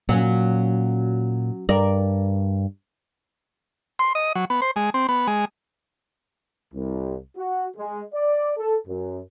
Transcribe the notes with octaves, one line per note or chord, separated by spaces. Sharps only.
A#2 F#3 C#4
G2 A#4 D5
C6
D#5
F#3
B3
C5
G#3
C4
B3
G#3
C2
F#4
G#3
D5
A4
F#2